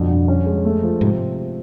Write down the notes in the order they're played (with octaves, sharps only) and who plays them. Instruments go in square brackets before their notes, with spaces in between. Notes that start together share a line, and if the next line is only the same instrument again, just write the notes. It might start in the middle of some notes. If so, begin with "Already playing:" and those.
Already playing: [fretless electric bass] F2 [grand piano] B2 D3
[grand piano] G2
C#4
G#3
A3
F3
[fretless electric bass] G#2 [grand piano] C3